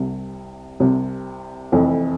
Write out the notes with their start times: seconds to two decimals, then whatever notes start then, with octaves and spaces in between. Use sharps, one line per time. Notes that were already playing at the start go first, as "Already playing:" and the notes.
Already playing: C2 C3 G3
0.80 C2 C3 G3
1.72 F1 F2 E3